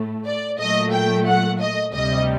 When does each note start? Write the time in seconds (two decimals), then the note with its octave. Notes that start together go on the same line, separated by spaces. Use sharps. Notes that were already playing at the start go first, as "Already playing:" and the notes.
Already playing: A2 A3
0.26 D5
0.59 A#2 F#3 A3 D#5
0.92 G5
1.27 F#5
1.60 D#5
1.94 D2 C3 G3 D#5